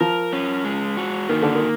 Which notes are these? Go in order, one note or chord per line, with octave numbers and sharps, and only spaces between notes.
F3 A#4
C#4
G#3
F#4
D#3 A#3
D3
D#3